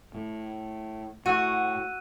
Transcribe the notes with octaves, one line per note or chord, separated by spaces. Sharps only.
A2
A2 F#4 E6 F#6 D#7